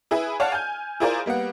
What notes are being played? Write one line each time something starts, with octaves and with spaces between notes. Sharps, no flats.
E4 G#4 B4 E5
C#5 D5 F5 F#5 A5 F6
G#5 G6
E4 F4 G#4 A#4 C5 D5
G3 A#3 B3 F#5